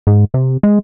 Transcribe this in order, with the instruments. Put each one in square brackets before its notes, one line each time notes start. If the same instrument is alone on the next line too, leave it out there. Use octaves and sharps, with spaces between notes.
[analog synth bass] G#2
C3
G#3